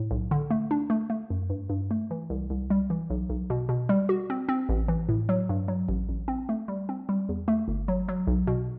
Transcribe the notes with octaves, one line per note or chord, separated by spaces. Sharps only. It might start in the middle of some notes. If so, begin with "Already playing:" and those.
Already playing: A2
B1
D3
A3
D4
A3
A3
F#2
G2
G2
A3
E3
C2
C2
G3
E3
B1
B1
B2
B2
G3
F#4
C4
C4
A1
E3
A2
F#3
G2
F#3
A1
A1
C4
A3
G3
C4
G3
E2
A3
G1
F#3
F#3
B1
B2